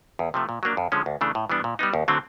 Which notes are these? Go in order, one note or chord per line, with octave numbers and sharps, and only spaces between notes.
E2
C3 F3 A3
A#2
F#3 A#3 D4
F2
D3 F3 G#3 C#4
D2
C#3 E3 A3 D4
A2
E3 G3 B3 D4
A#2
G3 B3 D#4
D#2
D3 F#3 A3 C4